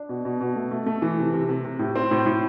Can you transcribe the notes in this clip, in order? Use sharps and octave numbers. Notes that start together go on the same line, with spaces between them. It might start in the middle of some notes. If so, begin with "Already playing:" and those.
Already playing: D4
B2
B2
B2
A3
A3
A3
E3
C3
C3
C3
C3
A2
C4
A2
A2